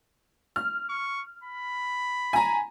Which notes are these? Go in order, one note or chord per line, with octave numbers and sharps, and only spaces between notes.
F6
C#6
B5
G#5 A#5